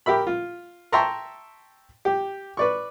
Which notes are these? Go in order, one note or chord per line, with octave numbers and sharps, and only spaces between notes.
G4 A#4 E5 B5
F4
E5 G5 A5 A#5 C6 C#6
G4
B4 D5 C#6